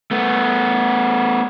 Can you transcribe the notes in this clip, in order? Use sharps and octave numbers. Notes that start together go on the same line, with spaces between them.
A3 B3